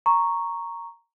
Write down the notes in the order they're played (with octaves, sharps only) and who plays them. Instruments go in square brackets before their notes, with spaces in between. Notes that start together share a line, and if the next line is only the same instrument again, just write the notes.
[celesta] A#5 C#6